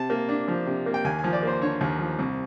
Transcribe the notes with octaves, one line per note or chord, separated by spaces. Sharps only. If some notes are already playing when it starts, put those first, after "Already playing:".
Already playing: C3 A5
A#3
D4
F3
C3
A#3
G5
D#2 G#5
G#5
F3
D5
A#3 C5
D3 C#5
D#2
F3
C2